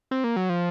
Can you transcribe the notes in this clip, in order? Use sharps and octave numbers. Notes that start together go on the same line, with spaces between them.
C4
A#3
F#3
F3